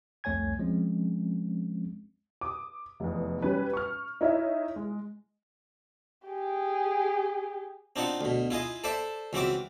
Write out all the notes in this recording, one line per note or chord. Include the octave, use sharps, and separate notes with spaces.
C2 F2 A3 C#5 G#5 G#6
F3 G#3 C4 C#4
D6 D#6
F1 E2
G3 C#4 B4
C#6 F6
D#4 E4 C#5 D#5 E5
G#3
G4 G#4
C4 D4 D#4 F4 F#5
D2 B2
E4 F4 G#4 D#5
A4 C5 D5 E5
C#2 E3 C4 F#4 E5 D6